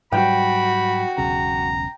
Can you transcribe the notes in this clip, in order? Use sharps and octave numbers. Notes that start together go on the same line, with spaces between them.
G#2 F#3 G3 F#4 G5 B5
E1 B1 C#3 A#5